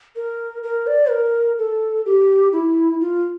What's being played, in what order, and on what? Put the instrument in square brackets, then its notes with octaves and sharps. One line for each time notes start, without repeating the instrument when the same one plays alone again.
[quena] A#4
A#4
D5
A#4
A4
G4
E4
F4